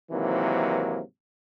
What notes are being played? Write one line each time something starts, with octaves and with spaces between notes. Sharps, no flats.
G#2 C3 D#3 E3 F#3 A#3